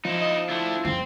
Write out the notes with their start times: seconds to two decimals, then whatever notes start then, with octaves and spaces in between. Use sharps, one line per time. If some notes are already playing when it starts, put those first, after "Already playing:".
0.05 F3 D#4 E4
0.22 D#5
0.49 A3 D4 E4
0.85 F#1 G#3 C4